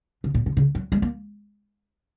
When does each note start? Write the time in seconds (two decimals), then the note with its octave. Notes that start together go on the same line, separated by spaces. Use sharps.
0.24 C#3
0.34 A#2
0.46 C#3
0.57 C#3
0.75 F#3
0.92 G#3
1.02 A#3